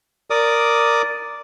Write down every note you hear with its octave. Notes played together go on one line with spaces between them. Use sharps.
A#4 D5 D6 D#6